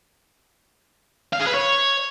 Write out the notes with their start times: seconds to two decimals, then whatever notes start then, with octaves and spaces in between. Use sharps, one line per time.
1.33 F5
1.40 G#4
1.47 B4
1.54 C#5